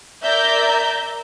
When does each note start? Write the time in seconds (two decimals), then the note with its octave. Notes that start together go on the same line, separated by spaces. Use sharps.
0.23 A#4 D5 E5 A#5 G6